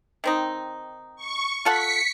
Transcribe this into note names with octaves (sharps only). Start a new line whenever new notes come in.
D#3 C4 D#4
C#6
F4 A4 F#5 B6 C#7